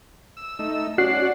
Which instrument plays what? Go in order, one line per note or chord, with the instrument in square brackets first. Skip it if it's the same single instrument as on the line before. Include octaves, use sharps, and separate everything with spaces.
[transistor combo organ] E6
A3 D#4 E6
[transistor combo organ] C#4 D5 F#5 [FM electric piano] F#4 F#6 C7